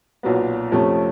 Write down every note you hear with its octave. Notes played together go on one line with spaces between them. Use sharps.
B1 A#2 F#3 B3
F2 C3 F3 A3 C#4